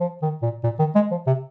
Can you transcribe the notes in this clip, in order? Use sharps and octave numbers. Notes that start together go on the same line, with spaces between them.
F3
D#3
A#2
A#2
D#3
G#3
F3
C3